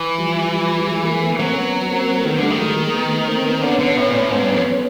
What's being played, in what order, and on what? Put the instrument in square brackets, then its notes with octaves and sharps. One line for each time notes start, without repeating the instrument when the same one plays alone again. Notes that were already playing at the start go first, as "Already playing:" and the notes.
Already playing: [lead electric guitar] E3
[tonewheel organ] F3 G3
F3 G3
G3
F#3 G#3
G#3 A#3
A3 B3
[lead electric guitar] F#3 [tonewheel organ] A#3 C4
[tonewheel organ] B3 C#4
A#3 C4
[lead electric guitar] D#3 [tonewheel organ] A3 B3
[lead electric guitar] D3 [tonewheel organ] G3 A3
[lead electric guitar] D#3
[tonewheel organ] F#3 G#3
G#3 A#3
A3 B3
A#3 C4
B3
C4
[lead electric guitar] D3 [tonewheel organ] B3 C#4
[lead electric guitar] D3
A2
A#2
A2
[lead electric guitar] G#2 [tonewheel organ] B3 C#4
[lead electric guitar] G2
F2